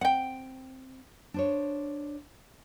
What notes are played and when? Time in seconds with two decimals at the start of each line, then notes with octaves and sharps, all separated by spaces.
0.01 C4 F#5 G5
1.34 D4 C5 C#5